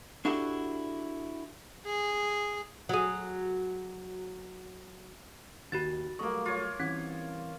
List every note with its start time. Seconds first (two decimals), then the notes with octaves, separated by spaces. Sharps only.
0.25 D4 E4 F#4 G4 A4
1.86 G#4
2.89 F#3 G#4
5.72 D#2 F#4 F#6 A6 E7
6.19 F#3 G3 A3 A#3 D#5 C#6
6.45 F4 C#5
6.80 E3 G3 C4 C#4 G#6